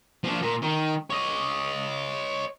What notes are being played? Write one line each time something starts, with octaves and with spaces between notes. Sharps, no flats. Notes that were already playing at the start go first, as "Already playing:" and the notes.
F3 D4
A#2
D#3
C#5 D#5